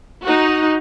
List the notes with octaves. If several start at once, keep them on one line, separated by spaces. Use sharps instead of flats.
D#4 F#4